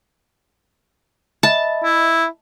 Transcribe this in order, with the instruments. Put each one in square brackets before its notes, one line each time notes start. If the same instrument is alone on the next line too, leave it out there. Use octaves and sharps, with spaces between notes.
[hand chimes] D#5 E5 B5 [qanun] A5
[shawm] E4